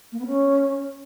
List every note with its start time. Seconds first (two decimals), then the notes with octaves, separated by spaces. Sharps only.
0.12 A#3
0.19 B3
0.26 C#4